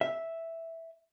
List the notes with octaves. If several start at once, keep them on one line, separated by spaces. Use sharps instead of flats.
E5